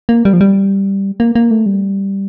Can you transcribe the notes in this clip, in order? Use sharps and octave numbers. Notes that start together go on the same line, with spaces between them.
A#3
G3
F3
G3
A#3
A#3
A3
G3